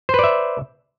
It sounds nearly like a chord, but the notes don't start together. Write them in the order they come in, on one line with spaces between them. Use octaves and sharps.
C5 B4 D5 E5